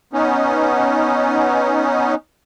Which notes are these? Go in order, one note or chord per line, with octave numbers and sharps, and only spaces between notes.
B3 C#4 D#4